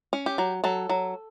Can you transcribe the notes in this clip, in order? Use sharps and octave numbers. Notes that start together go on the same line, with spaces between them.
C#4
G4
F#3
F#3 A4
F#3